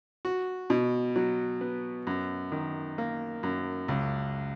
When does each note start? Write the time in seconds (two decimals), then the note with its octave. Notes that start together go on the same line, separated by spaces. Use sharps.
0.25 F#4
0.70 B2
1.16 F#3
1.61 B3
2.07 F#2
2.52 D#3
2.98 A#3
3.43 F#2
3.88 C#2